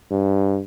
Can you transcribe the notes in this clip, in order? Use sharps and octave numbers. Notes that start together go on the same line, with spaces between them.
G2